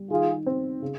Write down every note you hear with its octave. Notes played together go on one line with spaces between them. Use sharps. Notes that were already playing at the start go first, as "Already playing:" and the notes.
Already playing: G3
D#3 F4 G#4
C4
C#3